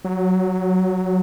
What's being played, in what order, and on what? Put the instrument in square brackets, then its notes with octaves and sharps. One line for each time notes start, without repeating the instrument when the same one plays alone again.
[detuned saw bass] F#3